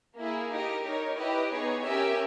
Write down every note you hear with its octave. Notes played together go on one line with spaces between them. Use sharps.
A#3 E4 G#4
D#4 G4 A#4 D#5
D#4 A#4 C#5
E4 G4 B4 D#5
B3 D#4 G#4 C#5
C#4 G4 A#4 E5 G#5